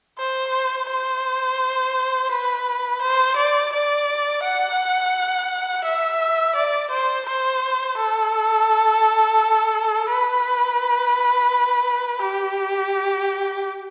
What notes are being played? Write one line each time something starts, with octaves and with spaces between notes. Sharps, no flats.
C5
C5
B4
C5
D5
D5
F#5
E5
D5
C5
C5
A4
B4
G4